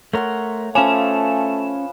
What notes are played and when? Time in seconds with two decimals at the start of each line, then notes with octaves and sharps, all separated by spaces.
0.13 A3 A#4 C#5 F#5 C6
0.75 F3 A3 C#4 B4 C#5 F5 G#5 E7